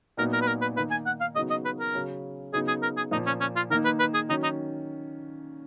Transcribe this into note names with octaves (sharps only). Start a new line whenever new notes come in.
A#2 F#3 B3 D#4 A#4
A#4
B4
A#4
B4
D#3 A#3 D#4 B4
G#5
F#5
F5
C#3 F#3 B3 D#4 D#5
D#5
B4
A#4
C#3 F#3 C#4
C#3 F#3 B3 D#4 G#4
G#4
A#4
G#4
A#2 F3 A#3 D#4
C#4
C#4
F4
D#3 A#3 D#4 A#4
B4
B4
G#4
D#3 F#3 C#4 D#4
D#4